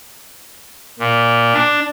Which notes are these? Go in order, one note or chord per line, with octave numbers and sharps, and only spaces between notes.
A#2
D4